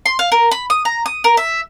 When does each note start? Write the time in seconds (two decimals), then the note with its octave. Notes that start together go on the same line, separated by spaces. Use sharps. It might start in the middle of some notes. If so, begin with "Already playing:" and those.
0.06 C6
0.19 F5
0.32 A#4
0.51 B5
0.70 D#6
0.85 A#5
1.06 D#6
1.24 A#4
1.37 E5